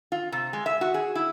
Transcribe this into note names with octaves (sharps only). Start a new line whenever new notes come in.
F4
C3
G#3
E5
F#4
G#4
E4